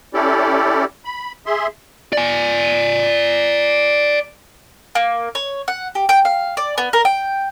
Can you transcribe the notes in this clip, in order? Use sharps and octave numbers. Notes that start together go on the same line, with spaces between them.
C#4 E4 G4 A4 D5
B5
G#4 E5 C6
D5 G#5
A#3
C#5
F#5
G4
G5
F5
D5
B3
A#4
G5